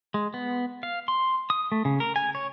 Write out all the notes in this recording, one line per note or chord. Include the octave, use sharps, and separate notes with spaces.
G#3
B3
F5
C6
D#6
A3
C#3
A#4
G#5
C#5